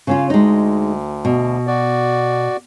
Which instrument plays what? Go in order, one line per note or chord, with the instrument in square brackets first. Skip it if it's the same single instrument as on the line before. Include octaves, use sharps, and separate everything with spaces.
[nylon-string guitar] C#3 C#4 F4
[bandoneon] D2 [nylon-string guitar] G#3 D#4
[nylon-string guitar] B2
[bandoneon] F#4 D5